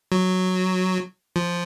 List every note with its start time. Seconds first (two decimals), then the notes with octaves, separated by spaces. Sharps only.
0.12 F#3
1.36 F3